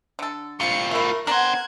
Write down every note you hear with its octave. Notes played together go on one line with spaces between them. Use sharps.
D3 A4
A2 G3 A#3 C4 F4 C#7
A3 E4 A#4
B3 C4 D4 A#4 C5 F#5 F#6 G#6